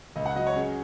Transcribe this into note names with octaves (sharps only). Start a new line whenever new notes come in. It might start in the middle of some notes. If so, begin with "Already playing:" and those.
C#2 D#5
F#5
F#3 D#5
C#5
C#4 G#4